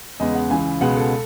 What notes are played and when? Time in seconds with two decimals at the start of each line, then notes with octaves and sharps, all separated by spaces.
0.20 E2 C#3 G#3 B3 D#5
0.35 F#5
0.50 C#2 C#3 E3 G#5
0.81 C#2 B2 G#3 B3 F#5
0.96 A4